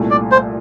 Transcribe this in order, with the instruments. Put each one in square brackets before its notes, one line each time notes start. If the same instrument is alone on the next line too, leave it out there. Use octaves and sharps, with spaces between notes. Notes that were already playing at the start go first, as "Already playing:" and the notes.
Already playing: [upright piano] C2 A#2 A3
[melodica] D5
C5